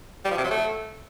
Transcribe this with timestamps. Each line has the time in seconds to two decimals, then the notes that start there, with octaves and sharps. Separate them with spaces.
0.25 G3
0.31 F3
0.38 C3
0.44 F#3
0.51 A3